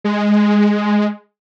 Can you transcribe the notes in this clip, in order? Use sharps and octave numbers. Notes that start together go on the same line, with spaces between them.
G#3